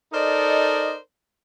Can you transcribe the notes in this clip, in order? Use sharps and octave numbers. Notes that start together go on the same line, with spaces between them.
D#4 A4 A#4 C5 D5 D#5